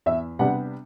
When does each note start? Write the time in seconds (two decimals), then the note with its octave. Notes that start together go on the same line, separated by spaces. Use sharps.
0.06 E2 E5
0.39 C3 G3 B3 D4 F#5